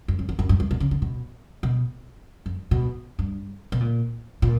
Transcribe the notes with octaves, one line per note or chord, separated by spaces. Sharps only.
F#2
F#2
E2
F#2
G2
G2
B2
C#3
D3
B2
B2
F#2
B2
G2
B2
A#2
A#2